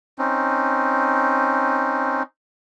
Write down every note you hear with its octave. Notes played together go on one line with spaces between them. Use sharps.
C4 C#4 D#4